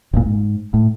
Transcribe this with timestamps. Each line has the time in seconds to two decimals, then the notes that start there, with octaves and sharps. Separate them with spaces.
0.13 F#1 G2 A#2
0.26 G#2
0.74 A2